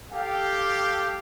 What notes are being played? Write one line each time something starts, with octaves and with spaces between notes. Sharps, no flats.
G4 A4 F5 G5